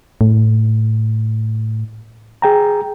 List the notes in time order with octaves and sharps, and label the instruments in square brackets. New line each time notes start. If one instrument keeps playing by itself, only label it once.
[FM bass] A2
[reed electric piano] G#4 G5 A#5